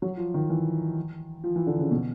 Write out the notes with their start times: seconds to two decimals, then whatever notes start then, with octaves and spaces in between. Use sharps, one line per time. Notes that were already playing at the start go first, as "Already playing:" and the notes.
0.02 F#3
0.17 F3
0.34 D#3
0.50 E3
1.44 F3
1.56 E3
1.67 D3
1.79 C#3
1.91 B2